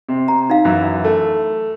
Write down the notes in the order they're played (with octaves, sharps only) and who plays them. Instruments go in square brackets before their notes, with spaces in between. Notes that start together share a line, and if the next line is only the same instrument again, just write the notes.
[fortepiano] C3
[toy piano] A#5
D#4 F5
[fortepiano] F#2 E3
A3